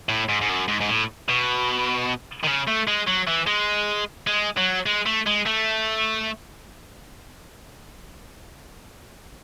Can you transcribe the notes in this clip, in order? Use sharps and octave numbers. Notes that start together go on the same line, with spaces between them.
A2
G#2
G#2
F#2
G#2
G#2
A2
B2
D#3
C#3
A3
G#3
F#3
E3
G#3
G#3
F#3
G#3
A3
G#3
A3